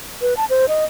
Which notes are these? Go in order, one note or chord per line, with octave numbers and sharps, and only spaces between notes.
B4
A5
C5
D#5